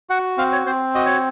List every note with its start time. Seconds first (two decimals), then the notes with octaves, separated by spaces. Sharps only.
0.10 F#4 F#5
0.38 C4 F5
0.52 C#5
0.66 C4 C5
0.95 F#4 D#5
1.06 C#5